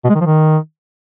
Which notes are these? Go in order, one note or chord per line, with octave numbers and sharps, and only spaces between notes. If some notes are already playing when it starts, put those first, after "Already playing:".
B2
G#3
D#3
F3
D#3